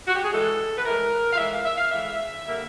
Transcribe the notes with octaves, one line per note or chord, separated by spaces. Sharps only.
F#4
G4
G#4
A2 E3 G#3 A4
B4
A2 E3 G#3 A#4
F5
A2 E3 G#3 E5
F5
E5
F5
A2 E3 G#3 E5
D3 G3 A#3